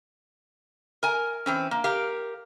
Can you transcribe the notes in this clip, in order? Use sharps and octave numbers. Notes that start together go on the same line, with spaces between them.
A#4 G#5
E3 C4 C#4
A#3
G4 A#4 F5